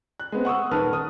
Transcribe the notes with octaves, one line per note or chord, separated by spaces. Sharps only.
F#6
G#3 B3 C4
F#5 C#6 D#6 E6
D#1 D#3 B4 A5 F6
D#6